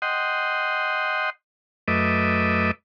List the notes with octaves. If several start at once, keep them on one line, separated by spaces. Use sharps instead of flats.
D#5 F#5 G5 C6
F#2 A3 B4 D#5 E5 D6